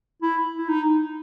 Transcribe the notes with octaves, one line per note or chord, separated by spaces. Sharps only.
E4
E4
D#4